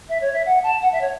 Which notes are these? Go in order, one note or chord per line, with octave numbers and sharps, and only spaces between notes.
E5
C#5
E5
F#5
A5
F#5
E5
C#5